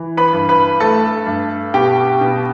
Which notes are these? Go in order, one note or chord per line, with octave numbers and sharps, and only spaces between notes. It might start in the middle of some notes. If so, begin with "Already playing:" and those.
Already playing: E3
B4 B5
G2
B4 B5
A3 A4 A5
G2
B2 G4 G5
B2